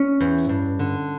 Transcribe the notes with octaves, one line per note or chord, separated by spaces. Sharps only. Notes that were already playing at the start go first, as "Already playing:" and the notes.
Already playing: C#4
E2
G2
D3